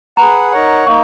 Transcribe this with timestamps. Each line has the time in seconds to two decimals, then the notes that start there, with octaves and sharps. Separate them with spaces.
0.17 G#4 B4 F#5 A#5
0.51 D#4 A#4 C#5 F#5
0.87 A#3 D#4 C#6